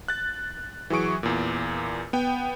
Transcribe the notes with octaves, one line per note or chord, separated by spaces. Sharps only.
F#6 A6
E3 F#3 G#4 C#6 D7
E2 A#2
B3 G5